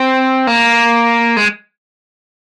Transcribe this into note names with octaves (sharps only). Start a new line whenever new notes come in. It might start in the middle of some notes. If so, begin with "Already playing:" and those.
Already playing: C4
A#3
G#3